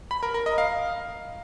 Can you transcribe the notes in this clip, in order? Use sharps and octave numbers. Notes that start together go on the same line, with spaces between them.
B5
A#4
A#4
D#5
F5